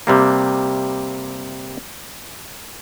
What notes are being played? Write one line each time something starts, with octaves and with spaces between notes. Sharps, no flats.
C3 G3 A#3